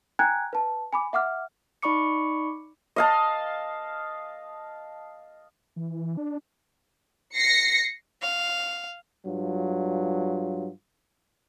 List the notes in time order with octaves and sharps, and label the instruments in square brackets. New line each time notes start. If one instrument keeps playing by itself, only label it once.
[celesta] G5 G#5 A#5 F#6 G#6
B4 A5
G#5 B5 D6
E5 F#5 D6 F6
[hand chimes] D#4 D5 B5 C#6 D6 C#7
[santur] D#5 F5 A5
[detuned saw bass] E3
D4
[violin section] A#6 C7 C#7
[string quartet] F5
[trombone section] G2 F#3 F4